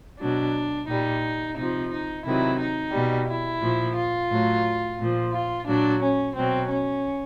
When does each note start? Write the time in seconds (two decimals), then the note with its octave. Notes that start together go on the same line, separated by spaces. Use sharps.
0.20 B2 F#3 D4
0.88 A#2 G3 D#4
1.57 C3 F3 D#4
1.91 D#4
2.25 C3 D#3 F#3 E4
2.59 D#4
2.93 B2 G3
3.28 E4
3.62 A#2 F3
3.96 F4
4.30 A2 F#3
4.99 A#2 F3
5.33 F4
5.67 A#2 F#3 D4
6.01 C#4
6.35 B2 F#3 C4
6.69 C#4